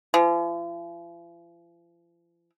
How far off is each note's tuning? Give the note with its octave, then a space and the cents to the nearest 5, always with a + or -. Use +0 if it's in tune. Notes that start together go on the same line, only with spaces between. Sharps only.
F3 -45